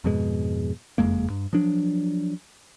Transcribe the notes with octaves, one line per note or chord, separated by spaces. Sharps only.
F2 G#2 B2 G#3
F#1 F2 G#3 A#3
G2
F3 F#3 D4